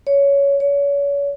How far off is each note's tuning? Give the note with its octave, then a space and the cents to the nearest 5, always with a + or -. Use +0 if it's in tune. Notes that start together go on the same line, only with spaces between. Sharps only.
C#5 +15
C#5 +35